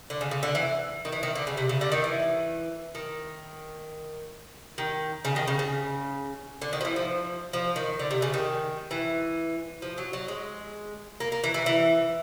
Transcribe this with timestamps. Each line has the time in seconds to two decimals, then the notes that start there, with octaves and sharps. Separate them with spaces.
0.10 D3
0.21 C#3
0.31 C#3
0.43 D3
0.55 E3
1.05 D#3
1.12 E3
1.23 D#3
1.36 D3
1.47 C#3
1.57 C3
1.69 C#3
1.81 D3
1.92 D#3
2.04 E3
2.95 D#3
4.78 D#3
5.25 C#3
5.36 D#3
5.48 C#3
5.59 C#3
6.62 D3
6.73 D#3
6.81 F3
6.85 E3
6.96 F3
7.53 F3
7.76 D#3
7.99 D3
8.11 C3
8.22 C#3
8.34 D#3
8.91 E3
9.82 F3
9.98 F#3
10.13 F#3
10.28 G#3
11.20 A#3
11.32 A#3
11.44 E3
11.54 E3
11.66 E3